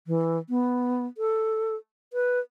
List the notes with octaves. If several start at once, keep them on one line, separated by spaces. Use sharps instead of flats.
E3
B3
A4
B4